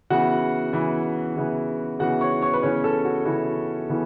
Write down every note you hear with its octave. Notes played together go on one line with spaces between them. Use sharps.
C#3 E3 B3 E4 F#4 F#5
C#3 E3 B3 E4
C#3 E3 B3 E4
C#3 E3 B3 E4 F#4 F#5
C#5 C#6
C#5 C#6
B4
C#3 E3 B3 C#4 E4 C#5
A4
F#4
C#3 E3 B3 E4 F#4
C#3 E3 B3 E4